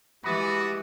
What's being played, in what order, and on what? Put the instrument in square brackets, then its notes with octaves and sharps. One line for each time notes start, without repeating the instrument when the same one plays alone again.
[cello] E3 G#3 [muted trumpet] F#4 [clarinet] G4 [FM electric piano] B5 D#6 A6